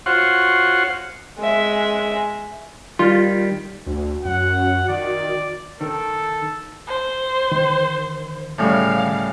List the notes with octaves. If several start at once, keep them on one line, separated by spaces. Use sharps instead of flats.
F4 F#4 C5 C#5 F#5
G#3 E5
D#3 G3 F4
D2 F#4
F#2 F#5
D#3 D5
D#3 A4
C5
D#3
A2 C#3 G3 F5